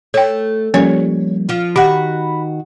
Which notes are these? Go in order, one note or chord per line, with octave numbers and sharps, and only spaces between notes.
A3 C#5 G5
F3 G3 A#3 C#4 C#5
F3 F4
D#3 F#4 G4 F#5 B5